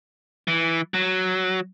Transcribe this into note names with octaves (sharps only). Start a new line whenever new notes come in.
E3
F#3